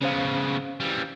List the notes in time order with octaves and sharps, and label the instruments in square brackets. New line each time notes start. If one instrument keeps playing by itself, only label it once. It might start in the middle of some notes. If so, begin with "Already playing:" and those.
[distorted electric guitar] C#3 B3 [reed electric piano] C#4 C5 F5
[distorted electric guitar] E3 G3